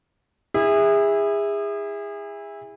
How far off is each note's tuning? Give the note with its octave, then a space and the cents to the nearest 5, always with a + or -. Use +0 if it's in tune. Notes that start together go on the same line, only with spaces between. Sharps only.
E4 -10 G#4 -30